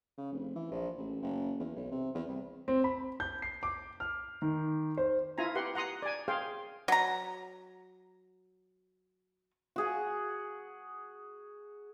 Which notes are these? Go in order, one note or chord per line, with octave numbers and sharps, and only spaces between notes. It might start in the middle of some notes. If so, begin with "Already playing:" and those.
C#3
F1
E3
A#1
A1
F#1
E2
B1
C3
E2
C2
C4
B5
G6
C7
D6
F6
D#3
C5
E4 F4 G#5 A#5
G4 B4 F#5 C6
F#5 A#5 C6 D#6
D5 G#5
G#4 C5 F5 G5
F#3 A#5
F#4 G#4 F#5